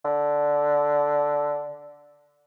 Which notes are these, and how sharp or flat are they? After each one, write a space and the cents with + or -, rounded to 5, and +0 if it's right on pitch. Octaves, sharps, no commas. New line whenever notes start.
D3 -5